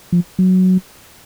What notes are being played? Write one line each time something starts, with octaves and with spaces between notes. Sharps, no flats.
F3
F#3